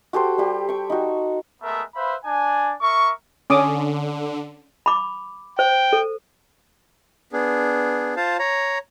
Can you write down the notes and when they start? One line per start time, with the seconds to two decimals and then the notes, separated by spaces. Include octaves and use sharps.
0.13 F#4 G4 A4 C5
0.38 G3 G4
0.69 G5 C#6
0.90 D#4 F#4
1.62 G#3 A3 B3 A#4 E5
1.95 B4 C5 E5 F5 B5
2.24 D4 G#5
2.80 A#4 E5 C#6
3.50 D3 C#4 D6 D#6
4.86 B5 D6
5.59 C5 G5
5.93 A4
7.33 B3 D4 G#4
8.16 F4 C5 F5 A5
8.39 C#5 A#5